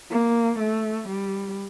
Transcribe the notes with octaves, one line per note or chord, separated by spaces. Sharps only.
A#3
A3
G3